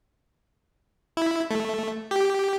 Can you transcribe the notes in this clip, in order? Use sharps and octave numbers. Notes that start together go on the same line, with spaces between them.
E4
A3
G4